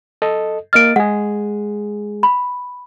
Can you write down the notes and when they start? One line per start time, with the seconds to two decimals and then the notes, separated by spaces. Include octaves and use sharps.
0.22 A4 D#5
0.73 A#3 D#5 F6 A6 D7
0.96 G#3 G#4 F#5
2.23 B5